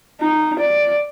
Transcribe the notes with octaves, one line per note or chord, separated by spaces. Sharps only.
D#4
D5